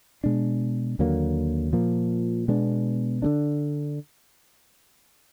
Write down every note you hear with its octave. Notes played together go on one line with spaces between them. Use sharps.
B2 G#3 D4
D#2 D3 F#3 A#3
A#2 F3 A#3
B2 G#3 B3 D4
D3 G#3 D4